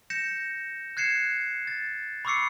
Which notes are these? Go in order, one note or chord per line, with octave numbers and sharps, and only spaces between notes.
G6 A#6 C#7 E7
F#6 G#6 C7 C#7 E7
A6
B5 C#6 D6 E6 C7 C#7